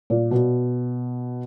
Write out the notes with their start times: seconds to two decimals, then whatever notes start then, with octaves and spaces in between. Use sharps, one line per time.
0.10 A#2
0.31 B2